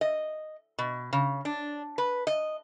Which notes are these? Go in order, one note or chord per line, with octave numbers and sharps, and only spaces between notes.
D#5
B2
C#3
D4
B4
D#5